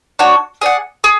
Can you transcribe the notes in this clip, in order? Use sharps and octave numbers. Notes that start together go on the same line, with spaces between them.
D4 F#4 C#5
G#4 D5 F#5
G#4